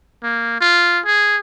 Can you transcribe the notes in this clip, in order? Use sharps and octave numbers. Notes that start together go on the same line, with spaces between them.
A#3
F4
G#4